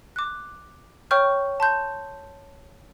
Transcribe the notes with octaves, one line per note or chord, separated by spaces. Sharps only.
D6 F#6
C#5 G5 C#6 F6 G6
A5 C6 G6